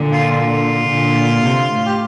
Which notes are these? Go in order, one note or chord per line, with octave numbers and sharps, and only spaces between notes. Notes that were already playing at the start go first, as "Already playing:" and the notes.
Already playing: A#2 D3
F4
F4
A#2 D3
C3
A2
G4